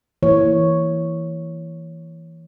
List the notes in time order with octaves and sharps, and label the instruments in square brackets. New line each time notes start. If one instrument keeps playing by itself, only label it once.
[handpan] E3 A#3 C#5